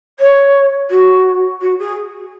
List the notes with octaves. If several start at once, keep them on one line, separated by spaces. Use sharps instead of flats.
C#5
F#4
F#4
G#4